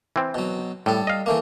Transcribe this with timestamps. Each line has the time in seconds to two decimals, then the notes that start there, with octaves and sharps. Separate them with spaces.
0.16 E3 C4
0.34 B2 F#3
0.86 A2 G3 A4
1.07 D#5 F5
1.26 E3 A3 A#3